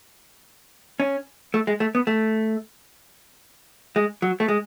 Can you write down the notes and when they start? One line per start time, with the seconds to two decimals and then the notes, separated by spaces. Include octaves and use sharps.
1.00 C#4
1.54 A3
1.67 G#3
1.80 A3
1.95 B3
2.07 A3
3.96 G#3
4.22 F#3
4.40 A3
4.48 G#3